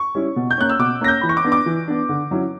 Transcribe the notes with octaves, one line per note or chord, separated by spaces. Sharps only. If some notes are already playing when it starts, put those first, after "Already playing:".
Already playing: C#6
G3 C#4 E4
B2
G6
A#3 C#4 F#6
E6
B2 D6
A#3 C#4 A#6
G6
E3 B5
C#6
D6
B3 D4
D6
E3
B3 D4
D3
F#3 C#4 E4